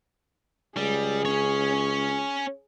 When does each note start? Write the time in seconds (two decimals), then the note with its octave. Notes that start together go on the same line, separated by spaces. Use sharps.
0.77 C#2 G3 G#4
1.25 C#4 C#5